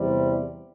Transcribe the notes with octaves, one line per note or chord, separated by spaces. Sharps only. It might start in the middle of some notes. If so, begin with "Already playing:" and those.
Already playing: E2 C3 G3